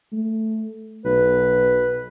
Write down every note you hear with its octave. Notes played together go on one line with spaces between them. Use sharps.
A3
B1 B4